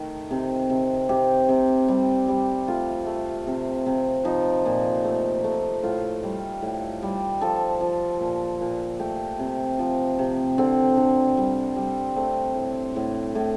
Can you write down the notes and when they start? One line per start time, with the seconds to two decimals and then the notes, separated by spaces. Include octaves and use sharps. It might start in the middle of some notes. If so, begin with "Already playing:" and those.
Already playing: D#3 A3
0.31 C3
0.70 C3
1.09 C3 G4
1.49 C3
1.88 G3
2.28 G3
2.68 A3 F4
3.06 A3
3.47 C3
3.86 C3
4.25 F3 D#4
4.66 A#2
5.05 A3
5.44 A3
5.83 A2 F4
6.23 G3
6.62 A2
7.03 G3
7.41 F3 A4
7.81 F3
8.20 A#2
8.61 A#2
8.99 A3 G4
9.39 C3
9.79 F3
10.19 C3
10.58 D3 C4
10.97 D3
11.37 G3
11.76 G3
12.16 A3 C4
12.56 A2
12.96 A2
13.35 A2